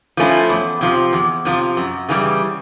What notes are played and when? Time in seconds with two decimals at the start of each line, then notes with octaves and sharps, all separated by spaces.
0.17 F3 A3 C#4 E4
0.49 E2
0.81 C3 F3
1.13 E2
1.45 C3 F3
1.77 F#2
2.09 C#3 E3 G3